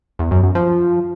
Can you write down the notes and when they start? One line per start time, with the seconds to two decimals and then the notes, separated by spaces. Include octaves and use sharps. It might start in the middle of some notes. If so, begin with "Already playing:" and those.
0.19 E2
0.31 F#2
0.43 F#2
0.55 F3